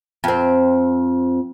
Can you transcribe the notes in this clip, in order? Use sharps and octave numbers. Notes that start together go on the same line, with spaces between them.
F2 C4